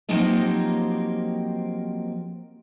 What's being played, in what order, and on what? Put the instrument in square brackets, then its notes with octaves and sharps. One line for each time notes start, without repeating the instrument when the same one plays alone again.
[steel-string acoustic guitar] F3 F#3 A#3 C4 D#4 G4